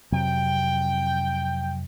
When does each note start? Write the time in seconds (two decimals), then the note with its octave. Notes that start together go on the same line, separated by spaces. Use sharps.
0.12 F2 C3 F#3 G5